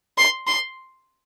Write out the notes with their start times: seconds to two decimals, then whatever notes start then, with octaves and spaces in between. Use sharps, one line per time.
0.17 C6
0.47 C6